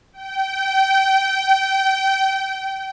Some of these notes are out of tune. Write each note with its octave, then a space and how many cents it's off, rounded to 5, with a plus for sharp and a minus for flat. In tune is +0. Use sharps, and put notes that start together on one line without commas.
G5 -25